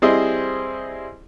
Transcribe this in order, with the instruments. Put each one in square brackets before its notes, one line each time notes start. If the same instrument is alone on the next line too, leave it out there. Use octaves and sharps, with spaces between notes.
[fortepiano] G3 C4 E4 G#4 C5 D#5